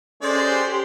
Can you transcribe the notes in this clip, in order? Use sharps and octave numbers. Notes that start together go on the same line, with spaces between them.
G#3 C#4 G4 A4 C5 D5